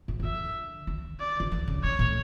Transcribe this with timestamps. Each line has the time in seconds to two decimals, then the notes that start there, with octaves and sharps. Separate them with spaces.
0.08 G#2
0.20 C#3
0.24 D3 E5
0.87 D3
1.20 D5
1.40 D3
1.52 E3
1.68 C#3
1.84 C#3 C#5
1.99 A2